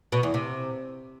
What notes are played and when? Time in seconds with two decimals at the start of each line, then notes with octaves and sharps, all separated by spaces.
0.12 B2
0.23 E2
0.34 C3